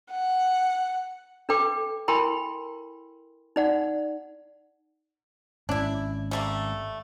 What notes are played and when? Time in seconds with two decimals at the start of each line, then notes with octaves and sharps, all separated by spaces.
0.11 F#5
1.49 D4 A4 B4 G5 D6
2.08 E4 A#4 G5 G#5 B5 C6
3.56 D#4 D5 F#5
5.69 G#1 C#4 D4 E4
6.31 G3 A3 A#3